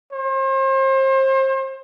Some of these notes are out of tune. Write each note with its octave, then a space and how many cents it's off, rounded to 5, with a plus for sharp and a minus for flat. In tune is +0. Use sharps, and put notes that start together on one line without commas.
C5 +35